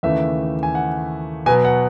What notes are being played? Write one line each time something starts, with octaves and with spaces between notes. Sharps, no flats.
D#2 C#3 E3 A3 E5
G#5
F#5
B2 F#3 B3 G#5
F#5